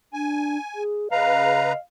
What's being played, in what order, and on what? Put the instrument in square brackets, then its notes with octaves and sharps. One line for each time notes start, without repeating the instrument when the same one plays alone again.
[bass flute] D4 [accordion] G#5
[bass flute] G#4
[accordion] C#3 B4 A#5 [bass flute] D#5 [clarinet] F5